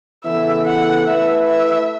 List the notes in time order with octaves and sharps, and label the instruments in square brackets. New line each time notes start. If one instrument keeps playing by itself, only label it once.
[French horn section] C#3 E3 B3 E4 A4 [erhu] E5
[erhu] F#5
[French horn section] A3 E4 B4 [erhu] E5
[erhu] E5